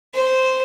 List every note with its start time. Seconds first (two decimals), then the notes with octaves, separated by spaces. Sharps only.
0.14 C5